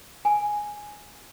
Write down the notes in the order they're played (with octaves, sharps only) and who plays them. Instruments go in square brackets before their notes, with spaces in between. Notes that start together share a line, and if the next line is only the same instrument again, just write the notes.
[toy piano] G#5